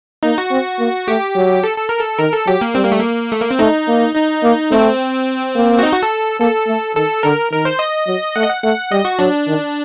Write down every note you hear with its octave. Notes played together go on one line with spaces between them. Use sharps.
A#3 D#4
F#4
C4
A#3
A3 G4
F#3
A4
A4
A#4
A4
D#3 A#4
A4
F#3 G4
A#3
G3 C4
A#3
A3
A#3
A3
A#3
C4
A3 D#4
A#3
D#4
A#3
A3 C4
A#3
F#4
D#4
F#4
A4
A#3 A4
A3
D#3 A4
D3 A#4
D#3 A#4
C5
D#5
F#3
A3 F#5
D#5
F#5
A3 F#5
G3 D#5
F#4
F#3 D4
D#3